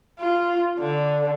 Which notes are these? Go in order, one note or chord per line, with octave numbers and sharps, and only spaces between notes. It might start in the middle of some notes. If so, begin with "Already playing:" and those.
F4
D3